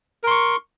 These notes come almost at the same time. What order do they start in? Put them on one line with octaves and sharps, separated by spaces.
A#4 C6 C#6